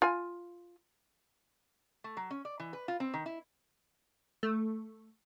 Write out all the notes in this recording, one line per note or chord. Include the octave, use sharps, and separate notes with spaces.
F4 G#5
A3
F#3
C#4
D5
E3
B4
F4
C4
D#3
E4
A3